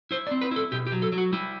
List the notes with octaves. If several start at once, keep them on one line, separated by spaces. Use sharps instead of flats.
E4 C5
D5
C4
B4
E4 A4
B2 G4
G4
F#3
A4
F#3
F#4
G3 E4